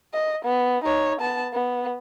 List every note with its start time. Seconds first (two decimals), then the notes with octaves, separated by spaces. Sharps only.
0.13 D#5
0.45 B3
0.84 D#4 C#5
1.20 B3 A5
1.53 B3